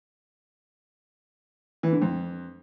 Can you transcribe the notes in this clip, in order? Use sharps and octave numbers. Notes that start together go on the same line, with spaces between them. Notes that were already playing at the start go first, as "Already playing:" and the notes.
E3
D3
F2